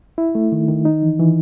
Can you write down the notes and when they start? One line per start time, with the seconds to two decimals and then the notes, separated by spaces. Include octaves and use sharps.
0.18 E4
0.35 A3
0.52 D#3
0.68 D#3
0.85 D#4
1.03 E3
1.20 E3